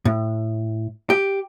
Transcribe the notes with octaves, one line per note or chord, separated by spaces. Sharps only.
A2
G4